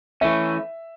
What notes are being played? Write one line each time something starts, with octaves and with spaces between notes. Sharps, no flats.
E3 A3 C#4 E5